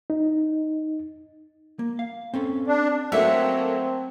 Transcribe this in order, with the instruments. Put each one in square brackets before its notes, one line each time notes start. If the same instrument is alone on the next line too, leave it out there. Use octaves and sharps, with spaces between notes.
[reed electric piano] D#4
[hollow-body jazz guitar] A#3
F5
C4 C#4 A4
[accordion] D4
[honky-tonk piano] F#3 A3 A#3 [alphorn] C4 [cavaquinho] E5 F#5